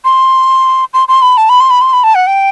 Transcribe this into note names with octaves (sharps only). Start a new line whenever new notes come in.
C6
C6
C6
B5
A5
B5
C6
B5
C6
B5
A5
F#5
G5